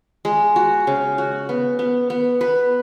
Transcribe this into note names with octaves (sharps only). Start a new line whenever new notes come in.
G#3
F#4
C#3
F#4
B3
B3
B3
B4